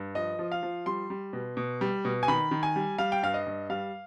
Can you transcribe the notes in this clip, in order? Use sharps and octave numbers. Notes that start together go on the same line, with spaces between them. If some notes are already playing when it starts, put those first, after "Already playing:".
Already playing: G2
F3 D#5
F3
F5
F3
G3 C6
G3
B2
B2
G3
B2
G#5
D#3 B5
D#3
G#5
G3
G3 F5
G5
G2 F5
D#5
G2
G3 F5